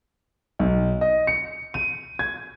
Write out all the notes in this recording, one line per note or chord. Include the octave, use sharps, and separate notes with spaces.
B1
D#5
C#7
D#7
G#6